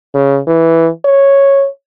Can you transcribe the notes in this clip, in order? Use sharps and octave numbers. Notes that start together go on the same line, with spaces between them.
C#3
E3
C#5